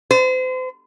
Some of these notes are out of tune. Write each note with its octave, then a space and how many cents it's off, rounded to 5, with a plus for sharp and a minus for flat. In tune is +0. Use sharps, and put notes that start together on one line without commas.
C5 -35